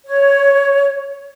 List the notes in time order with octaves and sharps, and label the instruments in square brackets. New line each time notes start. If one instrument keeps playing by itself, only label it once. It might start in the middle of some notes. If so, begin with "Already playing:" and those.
[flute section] C#5